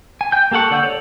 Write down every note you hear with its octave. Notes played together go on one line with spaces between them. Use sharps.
G#5
G5 G6
A#3 G4 A4 F#5 C#6
D3 D5 F#5 E6 G6
A4 C#5 D5